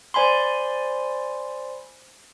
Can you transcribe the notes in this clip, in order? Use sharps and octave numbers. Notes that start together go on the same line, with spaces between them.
C5 D5 G#5 B5 C6